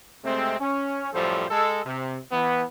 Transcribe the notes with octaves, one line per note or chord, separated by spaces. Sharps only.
C3 G#3 A3 C4
C#4
F#2 A2 F3 G3 A4 C5
G#3 A4
C3
E3 B3